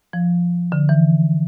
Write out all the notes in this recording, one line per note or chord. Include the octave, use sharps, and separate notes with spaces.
F3
D3
E3